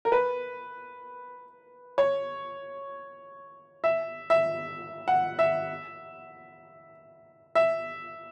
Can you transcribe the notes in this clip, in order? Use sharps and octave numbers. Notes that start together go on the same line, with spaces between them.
A#4
B4
C#5
E5
E5
F#5
E5
E5